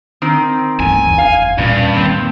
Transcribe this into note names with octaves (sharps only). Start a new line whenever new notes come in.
D#3 C4
D2 G2 E3 G#5
F#1 E2
F5
E2 G2 A#2 C#4
D#3 A#3 C4